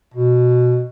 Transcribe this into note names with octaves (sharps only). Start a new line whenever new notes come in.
B2